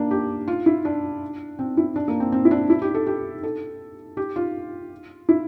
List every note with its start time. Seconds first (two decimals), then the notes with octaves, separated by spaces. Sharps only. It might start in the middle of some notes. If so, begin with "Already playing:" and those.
Already playing: A#3 D4
0.11 G4
0.48 F4
0.66 E4
0.85 D4
1.59 C4
1.77 E4
1.96 D4
2.08 A#3
2.20 C4
2.32 C4
2.45 E4
2.51 D4
2.70 E4
2.82 G4
2.94 A4
3.07 G4
3.43 A4
4.17 G4
4.36 F4
5.29 E4